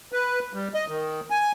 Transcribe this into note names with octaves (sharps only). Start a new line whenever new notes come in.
B4
G3
D#5
D#3
G#5